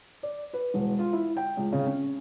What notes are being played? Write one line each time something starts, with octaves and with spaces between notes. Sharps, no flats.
D5
B4
E1
F4
E4
G5
C#2
C#3
C#4